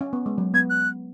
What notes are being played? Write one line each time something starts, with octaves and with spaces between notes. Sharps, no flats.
C#4
B3
G#3
F#3
B3 G#6
F#6